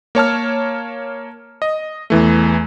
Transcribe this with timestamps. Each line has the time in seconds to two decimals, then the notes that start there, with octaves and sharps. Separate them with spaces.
0.15 A#3 C#5 A5 F6
1.62 D#5
2.10 E2 E3 A3